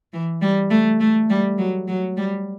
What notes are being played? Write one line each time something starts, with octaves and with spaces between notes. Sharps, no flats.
E3
G3
A3
A3
G3
F#3
F#3
G3